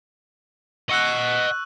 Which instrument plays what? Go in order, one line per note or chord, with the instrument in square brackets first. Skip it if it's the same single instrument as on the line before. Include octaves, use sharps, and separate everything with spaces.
[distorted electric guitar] D#5 F#5 [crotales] C#6 E6 F#6